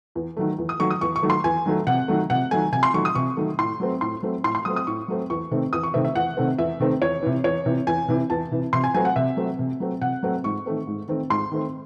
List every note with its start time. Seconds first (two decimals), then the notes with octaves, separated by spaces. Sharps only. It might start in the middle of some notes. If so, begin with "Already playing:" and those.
0.15 E2
0.37 D#3 F#3 A3
0.58 E2
0.69 D#6
0.80 D#3 F#3 A3 C#6
0.91 D#6
1.01 E2 C#6
1.16 C#6
1.23 D#3 F#3 A3
1.30 C6
1.44 E2 G#5
1.66 D#3 F#3 A3
1.87 C3 F#5
2.08 D#3 F#3 A3
2.30 C3 F#5
2.51 D#3 F#3 A3 G#5
2.72 C3 G#5
2.83 C6
2.94 D#3 F#3 A3 C#6
3.05 D#6
3.15 C3 C#6
3.37 D#3 F#3 A3
3.58 A2 C6
3.80 F#3 A3 C4
4.01 A2 C6
4.23 F#3 A3 C4
4.44 A2 C6
4.55 C6
4.65 F#3 A3 C4 D#6
4.76 D#6
4.87 A2 C#6
5.08 F#3 A3 C4
5.30 E2 C#6
5.51 C3 D#3 A3 C4
5.73 E2 D#6
5.83 C#6
5.94 C3 D#3 A3 C4 E5
6.05 E5
6.15 E2 F#5
6.37 C3 D#3 A3 C4
6.58 E2 E5
6.80 C3 D#3 A3 C4
7.02 E2 C#5
7.23 C3 E3
7.44 E2 C#5
7.66 C3 E3
7.87 E2 G#5
8.08 C3 E3
8.30 E2 A5
8.51 C3 E3
8.73 C3 C6
8.84 G#5
8.94 F#3 A3 C4 G#5
9.05 F#5
9.16 C3 E5
9.37 F#3 A3 C4
9.59 C3
9.80 F#3 A3 C4
10.01 C3 F#5
10.23 F#3 A3 C4
10.44 G#2 C#6
10.66 D#3 A3 C4
10.87 G#2
11.08 D#3 A3 C4
11.30 G#2 C6
11.52 D#3 A3 C4